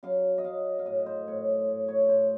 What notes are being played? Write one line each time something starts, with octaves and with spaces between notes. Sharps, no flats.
F#2 F5
D#5
F#2 F5
F5
A2 D#5
C5
A2 C#5
A2
C#5
A2 C5